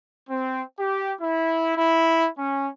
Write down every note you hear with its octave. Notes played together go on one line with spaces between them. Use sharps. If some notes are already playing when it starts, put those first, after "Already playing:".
C4
G4
E4
E4
C#4